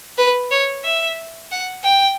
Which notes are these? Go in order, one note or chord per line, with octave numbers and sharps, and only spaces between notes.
B4
C#5
E5
F#5
G5